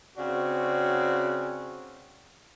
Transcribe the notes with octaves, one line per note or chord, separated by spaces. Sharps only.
C#3 C4 D4 F#4